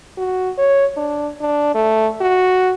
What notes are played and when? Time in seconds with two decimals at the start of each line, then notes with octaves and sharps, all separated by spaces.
0.18 F#4
0.58 C#5
0.97 D4
1.41 D4
1.75 A3
2.21 F#4